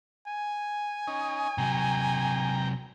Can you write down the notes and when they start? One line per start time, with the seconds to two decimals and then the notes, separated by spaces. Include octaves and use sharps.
0.27 G#5
1.07 C#4 D#4
1.58 C3 F#3 G5 A#5